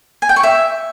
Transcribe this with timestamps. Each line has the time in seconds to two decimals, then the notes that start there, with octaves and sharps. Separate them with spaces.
0.22 G#5
0.29 G5
0.36 C#6
0.43 E5